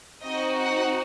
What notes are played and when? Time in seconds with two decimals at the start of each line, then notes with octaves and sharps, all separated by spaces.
0.23 C4 D#4 F#4 D#5
0.59 F#5